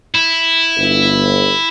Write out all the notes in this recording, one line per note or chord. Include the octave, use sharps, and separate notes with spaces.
E4
G1